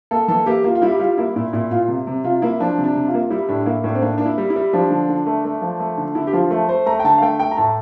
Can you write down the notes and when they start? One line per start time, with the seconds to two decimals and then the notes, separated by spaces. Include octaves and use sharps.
0.11 A#3 A4
0.28 E3 A4
0.46 A#3 G4
0.64 A#3 F4
0.75 F4
0.82 G3 E4
0.91 G4
0.99 G3 F4
1.17 A#3 E4
1.36 A#2 E4
1.53 A#2 E4
1.71 A#2 F4
1.88 C3
2.07 C3
2.24 C3 F4
2.42 A#3 E4
2.60 F3 D4
2.78 C3
2.84 D4
2.95 C3
3.07 F4
3.14 A#3
3.30 G3 E4
3.49 A2 D4
3.66 A#3 E4
3.84 A2 D4
3.95 C4
4.02 A#3 D4
4.18 A#3 D4
4.26 E4
4.38 G3
4.50 E4
4.56 G3
4.73 F3 D4
4.91 D3
5.09 D3
5.26 A3
5.44 A3
5.62 F3
5.80 A3
5.98 D3
6.15 D3 E4
6.27 G4
6.33 F3 F4
6.51 A3
6.68 A3 C5
6.86 A3 A#5
6.99 G5
7.04 D3 A5
7.18 F5
7.22 A3 G5
7.39 A3 G5
7.52 A#5
7.57 A2 A5